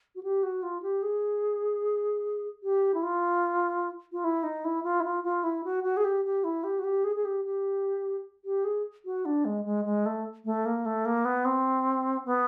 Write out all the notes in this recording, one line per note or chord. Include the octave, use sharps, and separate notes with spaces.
F#4
G4
F#4
F4
G4
G#4
G4
E4
F4
F4
E4
D#4
E4
F4
E4
F4
F4
E4
F#4
F#4
G#4
G4
G4
E4
G4
F#4
G4
G#4
G#4
G4
G4
G4
G#4
F#4
D4
G#3
G#3
G#3
A3
A3
A#3
A3
A#3
B3
C4
B3